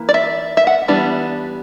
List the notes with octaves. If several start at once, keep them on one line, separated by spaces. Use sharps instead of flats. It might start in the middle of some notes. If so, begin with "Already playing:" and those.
Already playing: E3 A#3
D5
E5
E5
F#5
E3 G3 B3 D4